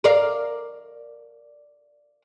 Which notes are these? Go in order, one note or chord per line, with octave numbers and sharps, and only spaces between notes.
A#4 D5 F5